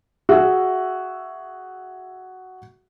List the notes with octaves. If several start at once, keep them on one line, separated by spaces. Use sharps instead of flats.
F#4 G#4 E5